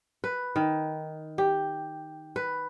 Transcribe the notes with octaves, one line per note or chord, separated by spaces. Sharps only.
B4
D#3
G4
B4